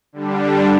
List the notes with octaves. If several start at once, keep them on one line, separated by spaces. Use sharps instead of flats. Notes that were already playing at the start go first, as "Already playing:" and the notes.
D3 G3 D4